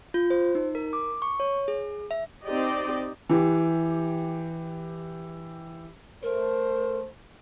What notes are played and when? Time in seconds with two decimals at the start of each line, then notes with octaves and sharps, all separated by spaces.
0.14 F4
0.30 C5
0.55 D#4
0.75 A#4
0.93 D6
1.22 C#6
1.40 C#5
1.68 G#4
2.11 E5
2.46 C4 D#4 G4 D5 D#5
3.29 E3 G4
6.23 A3 A#4 C5